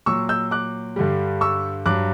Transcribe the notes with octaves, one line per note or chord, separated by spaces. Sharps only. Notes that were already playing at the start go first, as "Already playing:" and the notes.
A#2 F#3 C#6 E6
E6 G6
D6 F#6
G2 D3 G3
C#6 E6
G2 F#3 D6 F#6